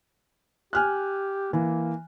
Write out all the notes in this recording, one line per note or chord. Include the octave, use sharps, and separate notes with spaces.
G4 G#5 F6 F#6
E3 A#3